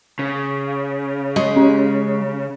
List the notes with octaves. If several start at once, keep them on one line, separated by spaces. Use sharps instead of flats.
C#3
G#3
C#4